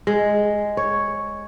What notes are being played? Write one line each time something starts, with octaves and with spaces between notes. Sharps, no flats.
G#3
C#5